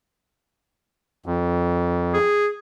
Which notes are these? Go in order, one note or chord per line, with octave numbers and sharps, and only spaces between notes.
F2
G#4